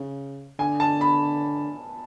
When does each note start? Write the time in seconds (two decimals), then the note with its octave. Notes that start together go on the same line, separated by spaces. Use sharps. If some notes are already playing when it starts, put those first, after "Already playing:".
Already playing: C#3
0.59 D3 G#5
0.80 A5
1.01 B5